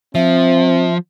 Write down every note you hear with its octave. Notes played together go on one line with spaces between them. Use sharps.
F3 C4 E5